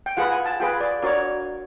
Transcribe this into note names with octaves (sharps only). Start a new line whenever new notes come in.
G5
F4 G#4 B4 F#5
G#5
A5
F4 G#4 B4 G5
D5
D4 F#4 A#4 C#5 D5